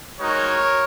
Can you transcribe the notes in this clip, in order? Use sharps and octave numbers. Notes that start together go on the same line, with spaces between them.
G#3 D#4 F#4 A#4 C#5